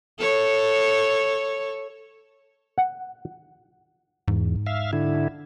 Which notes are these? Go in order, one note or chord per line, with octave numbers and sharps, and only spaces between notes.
A4 C#5
F#5
E2 G#2
E5 F5
D3 E4